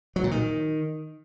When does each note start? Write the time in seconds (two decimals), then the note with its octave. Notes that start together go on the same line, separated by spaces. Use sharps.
0.16 F#3
0.24 A#2
0.31 D#3